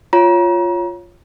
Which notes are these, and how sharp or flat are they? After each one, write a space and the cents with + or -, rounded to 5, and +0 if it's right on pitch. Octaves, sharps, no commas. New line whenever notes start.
F4 +0 C#5 +0 A#5 +35